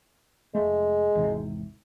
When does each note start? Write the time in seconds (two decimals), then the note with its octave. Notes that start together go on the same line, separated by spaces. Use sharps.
0.55 F1 G#3 A3
1.15 G#1 E2 C3